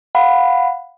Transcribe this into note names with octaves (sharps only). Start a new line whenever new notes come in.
F5 F#5 B5